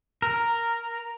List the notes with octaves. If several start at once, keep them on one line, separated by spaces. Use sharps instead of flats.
A#4